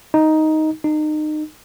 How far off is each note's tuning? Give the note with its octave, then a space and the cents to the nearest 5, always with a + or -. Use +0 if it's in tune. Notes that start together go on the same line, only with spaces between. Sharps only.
D#4 +5
D#4 -30